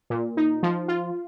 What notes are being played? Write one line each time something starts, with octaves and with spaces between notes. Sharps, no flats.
A#2
D#4
F3
F4